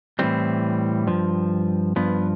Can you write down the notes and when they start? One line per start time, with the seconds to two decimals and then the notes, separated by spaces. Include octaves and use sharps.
0.19 A2 E3 G3 C4
1.07 G2 F3
1.96 G2 F3 B3